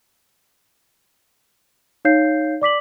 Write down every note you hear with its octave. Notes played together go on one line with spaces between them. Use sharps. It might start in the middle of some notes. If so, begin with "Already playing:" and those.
D#4 C#5 F5 G6 C7
D5 D6 B6 F#7